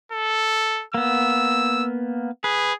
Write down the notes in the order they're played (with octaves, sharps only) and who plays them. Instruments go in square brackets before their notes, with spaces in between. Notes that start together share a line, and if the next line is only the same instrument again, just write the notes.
[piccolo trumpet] A4
[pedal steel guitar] A#3 B3 [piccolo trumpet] E6
[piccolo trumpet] G#4 [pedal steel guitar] B4